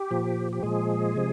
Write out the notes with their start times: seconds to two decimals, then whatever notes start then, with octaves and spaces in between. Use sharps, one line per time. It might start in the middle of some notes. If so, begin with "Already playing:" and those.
Already playing: G4
0.11 A#2 F3
0.53 G4
0.63 A#2 F3 G#3 G#4
1.16 C3 F3